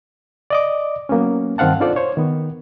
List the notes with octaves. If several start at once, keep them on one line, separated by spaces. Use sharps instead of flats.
D5 D#5 D6
F#3 A#3 B3 C#4
G2 D#3 C4 F5 F#5 A5
D4 D#4 F4 A4 C5 D5
C5 C#5
D#3 B3